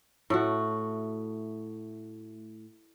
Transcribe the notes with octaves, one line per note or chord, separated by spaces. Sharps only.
A2 A3 F#4